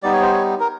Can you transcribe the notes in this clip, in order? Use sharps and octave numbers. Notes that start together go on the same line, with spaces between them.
G3 B3 D#4 D5
C#5
C5
C#5
A#4